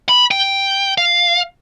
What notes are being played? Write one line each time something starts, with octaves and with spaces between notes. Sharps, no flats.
B5
G5
F5